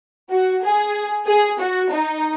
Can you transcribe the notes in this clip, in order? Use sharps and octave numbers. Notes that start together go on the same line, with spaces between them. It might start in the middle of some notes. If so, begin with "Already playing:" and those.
F#4
G#4
G#4
F#4
D#4